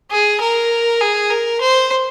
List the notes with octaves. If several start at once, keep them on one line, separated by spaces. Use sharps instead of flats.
G#4
A#4
G#4
A#4
C5